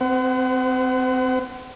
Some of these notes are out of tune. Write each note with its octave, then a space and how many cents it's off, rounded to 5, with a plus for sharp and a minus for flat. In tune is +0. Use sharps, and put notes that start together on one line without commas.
C4 -15 C5 -40 F#5 +25